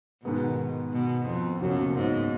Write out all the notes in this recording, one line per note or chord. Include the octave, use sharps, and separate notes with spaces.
G#2 B2 D#3 G#3 B3
B2
F2
C#2 F#2 B2 F#3 A#3 C#4
G#2